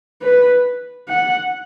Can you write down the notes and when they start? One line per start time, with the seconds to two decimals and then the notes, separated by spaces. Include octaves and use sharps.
0.22 B4
1.09 F#5